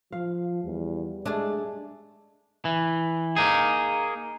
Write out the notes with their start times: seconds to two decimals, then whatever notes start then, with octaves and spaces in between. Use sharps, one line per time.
0.12 F3 F5
0.64 E2 G3
1.25 G#3 A3 D4 G#4 D5
2.65 E3
3.36 A#3 D#4 G#4